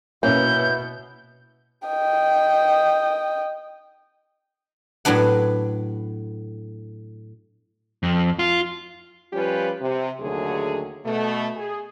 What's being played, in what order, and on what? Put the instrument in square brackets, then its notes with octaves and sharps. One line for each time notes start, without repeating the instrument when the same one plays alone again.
[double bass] B2 B3 [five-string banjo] A#3 C#4 [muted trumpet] E4 [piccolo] G6
[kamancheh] D#5 G5
[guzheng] A2 F#3 B3 D4 F#5
[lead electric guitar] F2
F4
[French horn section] F3 G3 C#4 F4 G4 B4
C3
D#2 D3 F#3 A3 G#4
B2 A3
G#4